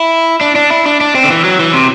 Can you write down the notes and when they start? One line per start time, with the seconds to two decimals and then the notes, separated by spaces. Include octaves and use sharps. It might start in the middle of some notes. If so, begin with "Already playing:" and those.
Already playing: E4
0.41 D4
0.55 D4
0.70 E4
0.86 D4
1.01 D4
1.15 C4
1.24 D3
1.30 E3
1.44 F#3
1.60 E3
1.73 C3